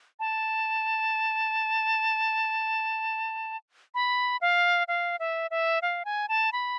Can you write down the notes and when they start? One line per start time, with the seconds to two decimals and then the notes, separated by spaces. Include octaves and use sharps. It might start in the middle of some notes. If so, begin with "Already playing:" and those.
0.20 A5
3.95 B5
4.41 F5
4.88 F5
5.20 E5
5.51 E5
5.82 F5
6.05 G#5
6.29 A5
6.53 B5